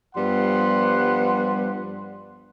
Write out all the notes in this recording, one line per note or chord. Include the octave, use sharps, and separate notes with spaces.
G2 F3 G3 B3 F#5 C6